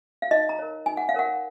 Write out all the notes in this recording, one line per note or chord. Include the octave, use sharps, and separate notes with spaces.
F5
D#4 D#5
A#5
A#4 C#5
D#4 G#5
F#5
F5
A#4 C#5 F#5